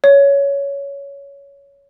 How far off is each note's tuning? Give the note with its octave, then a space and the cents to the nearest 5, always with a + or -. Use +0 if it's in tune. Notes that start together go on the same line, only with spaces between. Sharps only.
C#5 +15